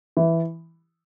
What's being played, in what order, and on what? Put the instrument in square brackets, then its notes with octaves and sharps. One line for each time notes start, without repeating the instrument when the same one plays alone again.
[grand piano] E3